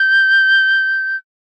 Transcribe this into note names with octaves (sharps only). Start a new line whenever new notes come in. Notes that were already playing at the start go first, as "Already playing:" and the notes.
Already playing: G6